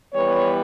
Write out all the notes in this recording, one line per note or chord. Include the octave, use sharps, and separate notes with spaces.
E3 G3 B3 C#5